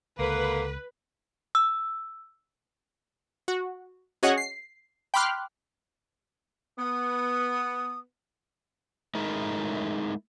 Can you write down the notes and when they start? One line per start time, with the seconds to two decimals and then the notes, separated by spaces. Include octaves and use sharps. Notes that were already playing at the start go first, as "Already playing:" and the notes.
0.19 C#2 D3 A#3 B4
1.55 E6
3.48 F#4
4.23 C#4 F#4 G#4 C#5 D#5 F#5
4.38 C7
5.14 G5 B5 C6 D6 F6 F#6
6.78 B3 D#6
9.15 G#3 A3 D#4 E4 G#4 A#4